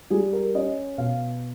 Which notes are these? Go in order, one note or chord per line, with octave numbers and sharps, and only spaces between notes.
G3 G#4
A#4
C#4 D#5
B2 F5